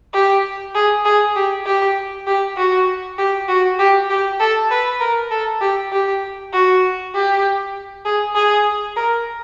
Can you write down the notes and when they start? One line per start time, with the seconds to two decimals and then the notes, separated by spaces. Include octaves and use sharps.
0.14 G4
0.75 G#4
1.05 G#4
1.36 G4
1.66 G4
2.27 G4
2.57 F#4
3.18 G4
3.48 F#4
3.79 G4
4.10 G4
4.40 A4
4.70 B4
5.00 A#4
5.31 A4
5.61 G4
5.92 G4
6.53 F#4
7.14 G4
8.05 G#4
8.35 G#4
8.96 A#4